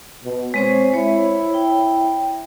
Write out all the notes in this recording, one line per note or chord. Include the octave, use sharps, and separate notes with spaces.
B2
G#3 C4 C5 C#5
E4 C#5
G5